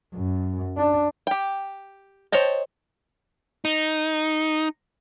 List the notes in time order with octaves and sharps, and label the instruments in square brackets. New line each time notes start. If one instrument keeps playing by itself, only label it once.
[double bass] F#2
D4
[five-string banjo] G4 G5
C5 C#5 D#5 G5 A5
[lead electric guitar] D#4